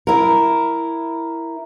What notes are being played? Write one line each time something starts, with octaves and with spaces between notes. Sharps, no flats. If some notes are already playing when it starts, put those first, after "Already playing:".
E4 A#4